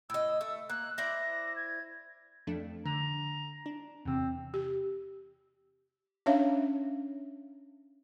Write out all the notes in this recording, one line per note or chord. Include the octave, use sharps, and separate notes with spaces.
A2 D#5 E6
A3
A#3 F#6
E4 C5 D5 A#6
G#6
F2 A3 D4
D3 A#5
D4
E2 C3 C4
G4
C#4 D4 C#5 E5 F5